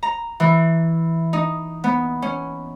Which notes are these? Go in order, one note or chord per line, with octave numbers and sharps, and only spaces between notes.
A#5
E3
D#4
B3
C#4